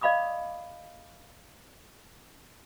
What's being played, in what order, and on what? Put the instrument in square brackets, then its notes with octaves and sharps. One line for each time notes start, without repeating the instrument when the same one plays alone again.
[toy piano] D5 D#5 F5 B5 D6 D#6